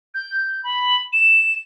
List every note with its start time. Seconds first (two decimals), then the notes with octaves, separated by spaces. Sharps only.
0.14 G6
0.64 B5
1.13 E7